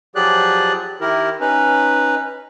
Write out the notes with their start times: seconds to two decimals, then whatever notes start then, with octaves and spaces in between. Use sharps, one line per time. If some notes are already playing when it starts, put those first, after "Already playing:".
0.16 F3 F#3 G4 G#4 D5 F#6
1.01 D#3 E4 G4 A#4
1.40 C#4 D#4 B4